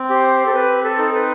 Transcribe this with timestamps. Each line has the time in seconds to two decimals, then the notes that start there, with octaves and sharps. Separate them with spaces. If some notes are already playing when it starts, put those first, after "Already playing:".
Already playing: C4
0.10 G4 C5
0.46 A4
0.54 C4 B4
0.83 A4
0.98 D#4
1.14 B4